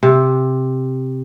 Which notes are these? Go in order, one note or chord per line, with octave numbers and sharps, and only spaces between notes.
C3